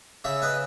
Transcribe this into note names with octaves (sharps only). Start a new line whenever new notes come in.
C#3 C#5 E5
B4 D#5